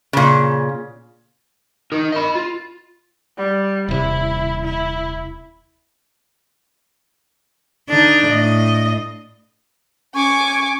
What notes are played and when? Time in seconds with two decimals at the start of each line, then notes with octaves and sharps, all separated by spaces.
0.13 A#2 C#3
1.92 D#4 A#4
2.12 D#5 B5
2.35 F4
3.37 G3
3.89 D#1 C3 E4
4.64 E4
7.89 D3 D4 D#4
8.28 A2 D#5
10.14 C#4 G#5 C#6 D6